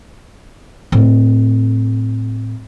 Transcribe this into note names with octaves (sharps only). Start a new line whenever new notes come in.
A2 C4